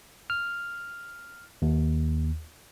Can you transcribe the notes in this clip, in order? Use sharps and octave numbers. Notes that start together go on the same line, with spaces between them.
F6
D#2